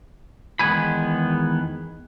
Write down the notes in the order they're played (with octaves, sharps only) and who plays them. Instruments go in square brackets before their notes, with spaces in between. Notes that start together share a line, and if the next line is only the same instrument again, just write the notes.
[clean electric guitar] E2 D#3 G#3 B3 G#5 B5